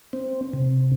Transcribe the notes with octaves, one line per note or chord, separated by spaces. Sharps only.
C4
C3